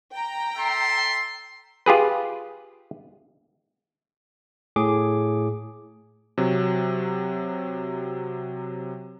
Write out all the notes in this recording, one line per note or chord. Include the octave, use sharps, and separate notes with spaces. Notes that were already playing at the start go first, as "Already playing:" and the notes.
G5 A#5
A4 E5 C6
F4 G4 G#4 B4
A2 G#4 D6
C3 F#3